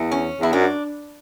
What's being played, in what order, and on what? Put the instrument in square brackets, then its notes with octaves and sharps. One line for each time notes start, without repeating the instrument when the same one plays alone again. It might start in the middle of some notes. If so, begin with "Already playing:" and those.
Already playing: [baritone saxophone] E2
[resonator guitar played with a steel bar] C#4
[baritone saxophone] E2 [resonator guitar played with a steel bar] E4
[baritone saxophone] F#2 [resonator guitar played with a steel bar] D4